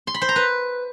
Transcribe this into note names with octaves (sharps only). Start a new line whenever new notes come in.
C6
B5
C5
A#5
B4